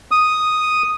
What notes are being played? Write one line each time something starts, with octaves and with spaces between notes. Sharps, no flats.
D#6